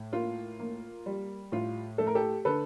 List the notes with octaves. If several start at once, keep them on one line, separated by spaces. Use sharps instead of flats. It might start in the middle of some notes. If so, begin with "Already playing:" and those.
Already playing: A2
A#3 F4
A#3
G3
A2 F4
A3 A4
A#4
G4 A4
D3 A4 B4